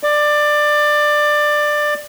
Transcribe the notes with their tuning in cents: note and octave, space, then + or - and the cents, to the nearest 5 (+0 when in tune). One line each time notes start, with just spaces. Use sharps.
D5 +20